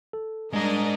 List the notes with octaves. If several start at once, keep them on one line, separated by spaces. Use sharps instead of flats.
A4
G3 G#3 D4 A#4 D#5 A#5